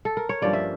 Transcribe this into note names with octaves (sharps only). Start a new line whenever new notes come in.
A4
A#4
C#5
G2 F3 A#3 C#4 D5
E5